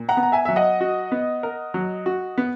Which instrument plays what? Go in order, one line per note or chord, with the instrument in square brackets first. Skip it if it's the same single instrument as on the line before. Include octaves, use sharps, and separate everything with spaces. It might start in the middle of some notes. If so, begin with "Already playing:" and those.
Already playing: [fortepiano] A#2
[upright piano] F#5 A#5
[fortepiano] B3
[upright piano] A#5
E5 G#5
[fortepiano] F#3 [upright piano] E5
[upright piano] D#5 F#5
[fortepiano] F#4
B3
A#4
F#3
F#4
B3